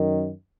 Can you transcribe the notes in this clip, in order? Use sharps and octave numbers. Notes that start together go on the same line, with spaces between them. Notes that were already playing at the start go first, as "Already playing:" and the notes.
Already playing: F#2 D#3